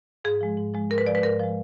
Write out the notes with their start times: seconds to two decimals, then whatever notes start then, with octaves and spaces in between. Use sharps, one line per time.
0.24 G#2 G#4
0.41 F3 G#3
0.58 G#2
0.74 F3 G#3
0.90 G#2 A#4
0.98 B4
1.06 F3 G#3 D5
1.15 B4
1.23 G#2 A#4
1.40 F3 G#3